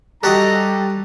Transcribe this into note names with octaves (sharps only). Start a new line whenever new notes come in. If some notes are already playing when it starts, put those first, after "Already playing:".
G3 D4 F#4 G4 A4 D#5 A#5